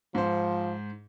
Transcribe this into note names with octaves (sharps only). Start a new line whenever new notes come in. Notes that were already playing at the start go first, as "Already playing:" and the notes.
G#2 F3 C5